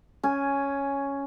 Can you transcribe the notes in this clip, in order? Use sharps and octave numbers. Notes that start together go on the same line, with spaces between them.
C#4 G#5